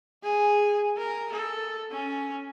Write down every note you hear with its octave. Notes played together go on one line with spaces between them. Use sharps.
G#4
A#4
A4
C#4